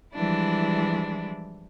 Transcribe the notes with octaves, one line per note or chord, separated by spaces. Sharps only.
E3 F3 G3 G#3 D4 E4